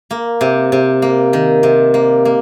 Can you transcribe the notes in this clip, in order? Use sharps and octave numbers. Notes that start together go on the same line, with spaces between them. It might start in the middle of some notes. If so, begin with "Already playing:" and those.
A#3
C3
C3
A#3
D#3
C3
A#3
A#3